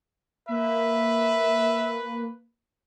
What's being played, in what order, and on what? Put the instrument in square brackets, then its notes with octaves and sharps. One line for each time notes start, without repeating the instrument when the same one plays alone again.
[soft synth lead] A#3 [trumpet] B4 [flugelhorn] E5